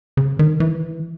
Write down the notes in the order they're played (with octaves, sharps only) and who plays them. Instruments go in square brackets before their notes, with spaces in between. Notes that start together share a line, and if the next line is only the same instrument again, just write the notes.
[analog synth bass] C#3
D#3
E3